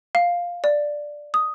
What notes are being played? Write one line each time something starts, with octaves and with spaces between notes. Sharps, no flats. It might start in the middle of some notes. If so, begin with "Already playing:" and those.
F5
D5
D#6